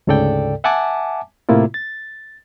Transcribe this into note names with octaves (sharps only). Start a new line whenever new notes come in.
D2 G#2 C#3 A4 D5 G5
E5 F#5 G#5 A5 D6
A2 C3 A#3 E4 F4
A6